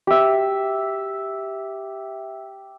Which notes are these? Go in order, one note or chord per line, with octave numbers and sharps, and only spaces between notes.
G4 E5